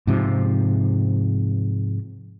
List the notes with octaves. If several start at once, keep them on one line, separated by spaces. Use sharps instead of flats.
G#2 C3 F3